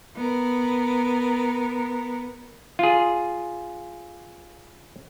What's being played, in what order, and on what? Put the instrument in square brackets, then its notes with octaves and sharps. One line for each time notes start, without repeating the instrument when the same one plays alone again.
[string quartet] B3 A#4
[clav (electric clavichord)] F4 G#4